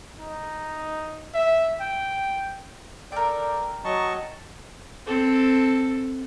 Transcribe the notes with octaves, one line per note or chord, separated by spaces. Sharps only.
D#4
E5
G5
A4 A#4 D5 G5
F#3 D#5 A5 C#6
C4 A4